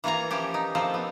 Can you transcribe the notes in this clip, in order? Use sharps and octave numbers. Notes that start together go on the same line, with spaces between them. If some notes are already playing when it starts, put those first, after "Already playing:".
E3 A#3 F4 C#5 A#5
E3 F3 C#4 G4
D#4
F3 A#3 C4 A4
B3